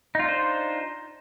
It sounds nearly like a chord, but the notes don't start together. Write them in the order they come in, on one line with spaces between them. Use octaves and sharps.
D#4 F4 D4 C5